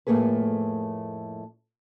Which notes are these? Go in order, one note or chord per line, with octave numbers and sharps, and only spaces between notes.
F2 A2 A3 A#3 G#4 B4